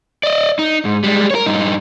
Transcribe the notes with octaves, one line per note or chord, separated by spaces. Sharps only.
D5 D#5
D#4
G#2
G3 G#3
A#4 C#5
G2 D#4